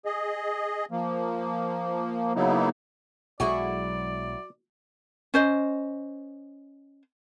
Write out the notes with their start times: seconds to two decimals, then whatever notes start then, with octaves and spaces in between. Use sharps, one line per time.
0.05 G#4 D#5
0.91 F3 A#3
2.36 C#3 F#3 A#3 B3 D#4 E4
3.40 B1 F#3 G#3 E4 F#4 G#4 D5
5.34 C#4 C5 D#5